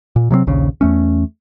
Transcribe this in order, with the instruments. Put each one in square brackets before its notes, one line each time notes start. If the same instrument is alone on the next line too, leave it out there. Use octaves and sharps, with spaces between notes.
[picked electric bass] A#2
C3 F#3 G#3 C4
A#1 D#2 C#3
E2 A3 C#4